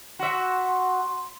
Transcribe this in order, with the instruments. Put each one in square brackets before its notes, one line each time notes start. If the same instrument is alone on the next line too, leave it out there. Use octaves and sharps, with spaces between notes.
[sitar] F#4 E5 [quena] C6